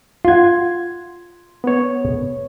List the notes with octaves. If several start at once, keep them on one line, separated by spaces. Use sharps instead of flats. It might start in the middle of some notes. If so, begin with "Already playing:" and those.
F4 F#5 C6 G#6
B3 C#5